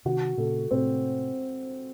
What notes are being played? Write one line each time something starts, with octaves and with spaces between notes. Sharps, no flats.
C3 D#3 F#4
A#2 C#3 A4
A2 C3 C4